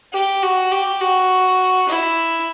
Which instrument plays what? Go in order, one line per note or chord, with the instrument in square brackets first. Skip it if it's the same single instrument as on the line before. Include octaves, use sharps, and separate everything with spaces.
[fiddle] G4
F#4
G4
F#4
E4